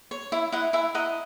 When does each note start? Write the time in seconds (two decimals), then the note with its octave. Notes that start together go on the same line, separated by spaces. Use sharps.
0.11 C#5
0.32 E4 E5
0.52 E4 D#5 F#5
0.73 E4 E5 G#5
0.95 D#5 F#5 A#5